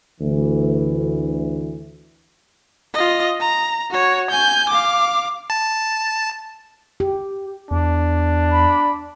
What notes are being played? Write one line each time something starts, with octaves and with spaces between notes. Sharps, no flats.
D2 E3
F4 D#5
A#5
F#4 C#5
G#5 G6
F5 D6
A5
G4
E2 D4
B5